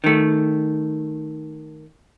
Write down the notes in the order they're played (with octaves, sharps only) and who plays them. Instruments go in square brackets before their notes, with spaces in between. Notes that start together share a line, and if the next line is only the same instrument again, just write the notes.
[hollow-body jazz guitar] D#3 A3